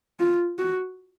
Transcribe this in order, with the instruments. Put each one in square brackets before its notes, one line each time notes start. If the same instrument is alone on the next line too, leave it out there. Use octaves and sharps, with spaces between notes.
[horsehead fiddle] F4
F#4